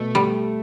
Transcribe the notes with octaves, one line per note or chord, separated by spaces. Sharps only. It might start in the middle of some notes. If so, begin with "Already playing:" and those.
Already playing: B2 A3
G3